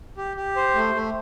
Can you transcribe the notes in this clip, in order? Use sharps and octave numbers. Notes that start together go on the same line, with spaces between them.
G4
G4
C5
A3
A3